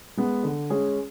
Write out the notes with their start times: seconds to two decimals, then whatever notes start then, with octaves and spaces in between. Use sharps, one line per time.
0.17 G#3 B3
0.43 D3
0.70 G#3 C#4 G#4